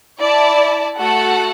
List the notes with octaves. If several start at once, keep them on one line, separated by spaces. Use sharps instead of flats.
E4 D5 A5
A3 F#4 A4 F#5